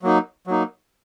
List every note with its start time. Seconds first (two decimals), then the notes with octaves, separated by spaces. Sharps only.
0.02 F#3 A#3 D#4
0.47 F#3 A#3 D#4